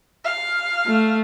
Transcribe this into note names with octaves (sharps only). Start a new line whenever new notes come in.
F5
A3